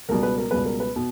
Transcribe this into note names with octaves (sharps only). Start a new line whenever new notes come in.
C#2 B2 G3 A#4
B4
A#4
C#2 B2 G3 B4
A#4
B4
B2